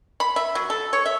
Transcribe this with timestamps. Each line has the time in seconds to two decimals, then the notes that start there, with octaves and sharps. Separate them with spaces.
0.20 B5
0.36 E5
0.55 F#3
0.70 A4
0.93 C#5
1.06 E5